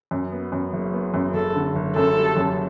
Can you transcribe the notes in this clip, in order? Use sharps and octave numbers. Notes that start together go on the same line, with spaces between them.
F#2
B3
F#2
F#1
B3
F#2
F#1 A4
D3
F#1
F#2 A4
G3
F#2